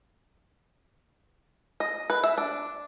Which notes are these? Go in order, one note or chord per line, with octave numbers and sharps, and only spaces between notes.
D#5
B4
E5
D4